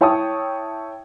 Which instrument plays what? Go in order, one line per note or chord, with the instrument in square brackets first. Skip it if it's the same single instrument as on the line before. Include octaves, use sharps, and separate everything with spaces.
[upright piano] E4 C#5 G5 A5 C#6 D#6